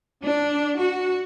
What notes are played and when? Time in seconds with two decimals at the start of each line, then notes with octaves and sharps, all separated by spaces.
0.24 D4
0.79 F#4